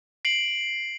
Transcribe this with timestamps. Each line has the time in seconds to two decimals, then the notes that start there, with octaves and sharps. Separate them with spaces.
0.25 C7 D7 F#7